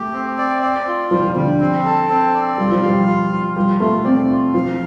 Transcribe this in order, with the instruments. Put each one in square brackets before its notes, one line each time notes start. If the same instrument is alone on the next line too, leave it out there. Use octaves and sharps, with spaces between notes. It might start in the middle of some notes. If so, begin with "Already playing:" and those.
Already playing: [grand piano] A3 [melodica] G4
[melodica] C4
D5
D5
F4
[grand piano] F3 [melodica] G3
[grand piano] F3
[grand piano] D3 [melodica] G3
[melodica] C4
A4
C4
D5
[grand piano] G3 [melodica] F4
[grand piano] F3
[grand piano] G3 [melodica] F5
[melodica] F4
F4
[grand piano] G3 [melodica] F4
[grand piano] A3 [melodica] F4
[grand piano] C4 [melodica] D5
[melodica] F4
[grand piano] F3 [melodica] F5